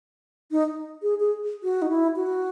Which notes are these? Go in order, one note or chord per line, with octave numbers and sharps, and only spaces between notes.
D#4
G#4
G#4
F#4
D#4
E4
F#4